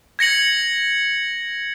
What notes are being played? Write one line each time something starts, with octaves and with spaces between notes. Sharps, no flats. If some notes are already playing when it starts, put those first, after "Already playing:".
G#6 A#6 C#7 F#7